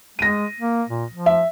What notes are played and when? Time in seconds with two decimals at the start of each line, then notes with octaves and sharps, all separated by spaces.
0.19 G#3 A#6 D#7
0.61 A#3
0.89 A#2
1.12 F3
1.26 E5